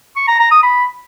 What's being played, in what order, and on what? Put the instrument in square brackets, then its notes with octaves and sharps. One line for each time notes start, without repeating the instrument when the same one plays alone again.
[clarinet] C#6
A#5
A#5
D#6
B5